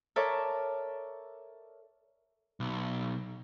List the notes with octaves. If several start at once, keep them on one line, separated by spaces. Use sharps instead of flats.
A4 A#4 C#5 D5 E5
B1